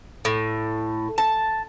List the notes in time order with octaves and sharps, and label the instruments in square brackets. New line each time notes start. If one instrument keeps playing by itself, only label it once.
[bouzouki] A2
A5